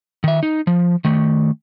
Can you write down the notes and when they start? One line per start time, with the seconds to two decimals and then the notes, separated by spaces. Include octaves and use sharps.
0.24 D#3 E5
0.43 D#4
0.67 F3
1.05 D#3 A3